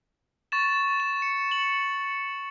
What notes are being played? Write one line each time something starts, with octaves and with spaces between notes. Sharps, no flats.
C#6 A6 E7
E7
C#7
F#7